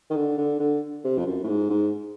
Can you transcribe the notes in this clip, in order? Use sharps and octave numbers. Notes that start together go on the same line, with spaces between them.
D#3
D3
D3
D3
C3
F2
F#2
A2
G#2
G#2